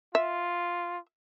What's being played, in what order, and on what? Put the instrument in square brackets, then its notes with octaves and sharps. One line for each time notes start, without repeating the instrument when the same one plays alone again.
[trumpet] F4 [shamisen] E5